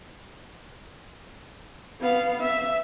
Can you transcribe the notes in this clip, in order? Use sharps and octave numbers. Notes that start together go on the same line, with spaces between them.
B3 F5
E5